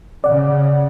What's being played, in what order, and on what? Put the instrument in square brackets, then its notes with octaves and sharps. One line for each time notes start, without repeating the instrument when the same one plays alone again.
[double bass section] C#3 [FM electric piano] D5 F#5